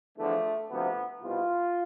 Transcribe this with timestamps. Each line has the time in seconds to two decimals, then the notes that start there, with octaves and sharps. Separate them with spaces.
0.18 E2 D3 F3 A3
0.70 D2 C3 F3 B3
1.22 C2 B2 F4